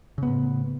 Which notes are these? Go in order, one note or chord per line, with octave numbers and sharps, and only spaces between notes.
A2 C#3 B3